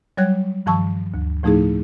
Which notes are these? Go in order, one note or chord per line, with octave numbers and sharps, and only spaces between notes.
F#3 G3 C#5 F#6 G#6
G2 D#3 F3 A5 C#6 E6
D2
A2 F3 A3 D#4 E4 G#4